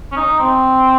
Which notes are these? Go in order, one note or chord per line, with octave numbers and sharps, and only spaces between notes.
C#4
D#4
C4